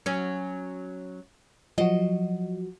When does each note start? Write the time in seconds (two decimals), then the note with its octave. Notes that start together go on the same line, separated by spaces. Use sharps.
0.06 F#3 C#4
1.78 F3 F#3 F#4 D#5